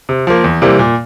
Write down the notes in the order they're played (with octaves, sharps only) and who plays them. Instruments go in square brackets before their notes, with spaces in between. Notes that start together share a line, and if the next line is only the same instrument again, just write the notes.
[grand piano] C3
F3 A#3
E2
C3 E3 G3 A#3
A#2